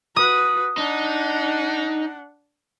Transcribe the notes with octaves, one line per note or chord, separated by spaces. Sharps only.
F#4 B4 D#6
D4 D#4 F#5